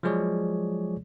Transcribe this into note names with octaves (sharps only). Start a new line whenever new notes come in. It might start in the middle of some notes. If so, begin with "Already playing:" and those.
F3 F#3 G#3 G#4 C#5 D5